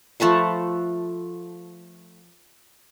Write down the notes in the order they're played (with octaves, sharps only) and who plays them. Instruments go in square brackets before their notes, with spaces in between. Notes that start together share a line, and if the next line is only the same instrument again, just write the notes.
[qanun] F3 A3 B4 F#5